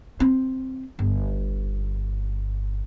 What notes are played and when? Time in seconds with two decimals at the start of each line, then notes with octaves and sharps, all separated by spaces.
0.20 C4
0.99 G1